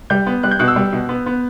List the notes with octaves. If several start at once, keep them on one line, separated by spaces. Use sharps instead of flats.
G3 G6
B3
G3 F#6
G6
B2 F#6
E6
G3
B2
B3
B3